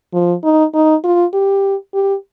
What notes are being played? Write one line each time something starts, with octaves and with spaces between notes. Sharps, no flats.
F3
D#4
D#4
F4
G4
G4